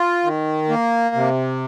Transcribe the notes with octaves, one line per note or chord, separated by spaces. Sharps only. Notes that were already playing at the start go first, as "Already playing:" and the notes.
Already playing: F4
D#3
A#3
C3